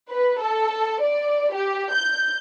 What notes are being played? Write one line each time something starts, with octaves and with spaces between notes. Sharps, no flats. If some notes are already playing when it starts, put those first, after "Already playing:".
B4
A4
D5
G4
G6